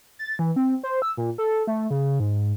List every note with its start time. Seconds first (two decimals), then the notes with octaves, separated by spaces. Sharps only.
0.19 A6
0.39 E3
0.56 C4
0.83 C5
1.02 E6
1.17 A#2
1.38 A4
1.67 A3
1.90 C#3
2.20 G#2